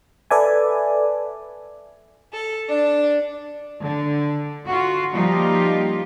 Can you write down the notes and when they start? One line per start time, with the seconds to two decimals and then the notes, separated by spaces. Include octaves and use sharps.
0.30 A4 B4 D5 E5 G#5
2.32 A4
2.69 D4
3.83 D3
4.67 F4 F#4
5.12 F3 G3 A#3 D#4 F4 G4